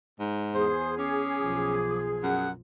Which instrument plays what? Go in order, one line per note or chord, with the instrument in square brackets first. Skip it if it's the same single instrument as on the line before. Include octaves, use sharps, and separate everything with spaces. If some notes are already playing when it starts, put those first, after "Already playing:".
[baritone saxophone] G#2
[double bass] E2 [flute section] G#4 [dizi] C5
[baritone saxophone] C#4 [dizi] D6
[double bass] B1 F3
[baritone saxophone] F#2 [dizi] F#5